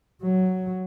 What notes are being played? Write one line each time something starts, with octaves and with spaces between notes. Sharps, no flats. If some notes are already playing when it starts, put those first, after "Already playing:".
F#3